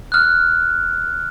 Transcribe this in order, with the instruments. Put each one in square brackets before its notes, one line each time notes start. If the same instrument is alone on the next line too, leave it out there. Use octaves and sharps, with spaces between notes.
[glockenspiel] F6 F#6